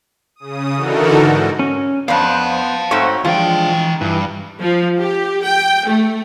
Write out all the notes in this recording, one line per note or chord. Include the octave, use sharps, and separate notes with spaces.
C#3 D#6
D3 E3 D#4 F#4 A4 A#4
G#2
C#4
F2 B3 C4 D4 C5 F5 F#5 A5
G#2 A3 C4 F#4 C#5
E3 F3 G#3 D4 F4 G5
G2 E3
F3
G4
G5
A3